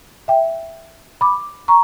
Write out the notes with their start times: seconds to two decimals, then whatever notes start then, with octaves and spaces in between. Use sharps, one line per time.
0.28 E5 G5
1.21 B5 D6
1.68 A#5 C#6